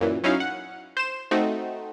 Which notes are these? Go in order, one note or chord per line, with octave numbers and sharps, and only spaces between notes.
F#2 A#2 E3
F#3 C#4 D#4 E4 F5
F#5
C5 E7
A3 C4 D#4 F#4